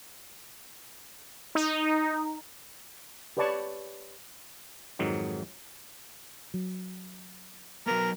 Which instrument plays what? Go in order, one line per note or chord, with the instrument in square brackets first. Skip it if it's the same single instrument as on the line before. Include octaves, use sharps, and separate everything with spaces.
[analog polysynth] D#4
[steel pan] G4 B4 C#5 D5 A5 C#6
[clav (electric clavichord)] F2 G#2 D#3 F#3
[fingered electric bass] F#3
[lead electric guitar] F#3 B3 [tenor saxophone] A#4